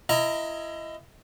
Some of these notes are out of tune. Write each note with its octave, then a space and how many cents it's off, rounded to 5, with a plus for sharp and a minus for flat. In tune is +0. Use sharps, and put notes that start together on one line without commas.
E4 +30 D#5 +20 A#5 +0